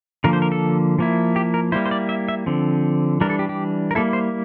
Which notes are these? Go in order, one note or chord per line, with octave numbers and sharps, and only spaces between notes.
D3 F3 A#3 A#4
C5
A#4
A4
F3 A#3 E4
G4
A#4
G3 A#3 E4 C5
C5
D5
E5
E5
D3 F3 C4
E3 G3 D4 A#4
A4
G4
G4
A#4
G3 A#3 E4 A4
C5